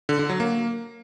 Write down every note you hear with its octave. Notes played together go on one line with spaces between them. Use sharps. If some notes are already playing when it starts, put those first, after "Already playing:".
D3
D3
F#3
A#3